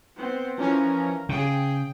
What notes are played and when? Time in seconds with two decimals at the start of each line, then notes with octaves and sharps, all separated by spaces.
0.16 B3 C4
0.57 E3 F3 C#4 A#4
1.29 C#3 G#4 G5